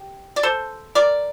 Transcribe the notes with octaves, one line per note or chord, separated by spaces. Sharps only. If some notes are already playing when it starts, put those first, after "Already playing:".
Already playing: G4
D5
A4 C5
A#4 D5